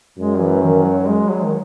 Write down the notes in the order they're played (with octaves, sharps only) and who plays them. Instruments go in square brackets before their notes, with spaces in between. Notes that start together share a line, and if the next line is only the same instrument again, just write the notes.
[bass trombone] F#2 [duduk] G#3
[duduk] E3
D#3
F#3
G#3
F#3
D#3